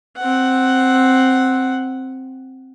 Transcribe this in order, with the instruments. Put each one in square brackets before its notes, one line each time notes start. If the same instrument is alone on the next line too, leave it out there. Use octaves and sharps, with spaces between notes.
[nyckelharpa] C4 F#5